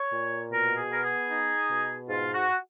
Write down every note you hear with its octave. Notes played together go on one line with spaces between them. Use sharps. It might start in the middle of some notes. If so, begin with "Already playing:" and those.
Already playing: C#5
A#2
B2 A#4
G#4
B3 A#4
G#4
D#4
B2
G#2 F4
F#4